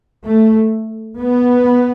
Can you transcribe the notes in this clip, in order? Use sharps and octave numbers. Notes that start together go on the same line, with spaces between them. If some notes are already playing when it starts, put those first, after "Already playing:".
A3
B3